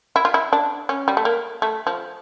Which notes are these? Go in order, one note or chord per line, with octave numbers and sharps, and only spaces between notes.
E4
F4
E4
D4
C#4
G3
A3
A#3
A3
F3